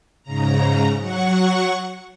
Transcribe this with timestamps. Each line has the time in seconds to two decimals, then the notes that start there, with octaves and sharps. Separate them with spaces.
0.23 G#2 C#3 A#5
0.99 F#3 F#5 C#6